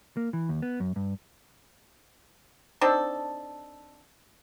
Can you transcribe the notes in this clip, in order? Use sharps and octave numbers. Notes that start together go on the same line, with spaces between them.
A#3
E3
D#2
B3
F#2
G2
C4 D4 D#4 A4